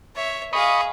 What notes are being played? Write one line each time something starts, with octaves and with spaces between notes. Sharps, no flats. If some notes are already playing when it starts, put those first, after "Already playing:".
C#5 E5
G#4 D#5 F5 B5 C#6